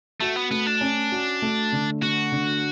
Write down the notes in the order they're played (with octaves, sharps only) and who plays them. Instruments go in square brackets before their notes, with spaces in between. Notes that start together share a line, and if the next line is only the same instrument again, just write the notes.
[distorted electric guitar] A3 [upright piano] F#4
[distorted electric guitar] B3
[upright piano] A3 [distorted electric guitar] B3
[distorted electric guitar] D4
[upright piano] C#4
F#4
A3
D3
[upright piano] A3 [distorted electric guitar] F#4
[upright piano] D3